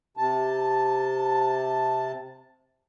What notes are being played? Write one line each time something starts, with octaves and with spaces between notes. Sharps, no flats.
C3 A5